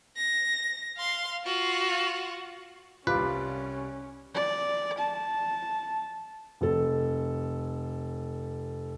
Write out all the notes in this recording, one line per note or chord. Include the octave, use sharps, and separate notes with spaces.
A#6
F5 C6
F4 F#4
C2 G3 C#4 F4 B4 D6
D5
A5
F1 A4